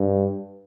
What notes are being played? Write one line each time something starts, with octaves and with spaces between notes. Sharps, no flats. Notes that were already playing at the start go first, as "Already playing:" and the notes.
Already playing: G2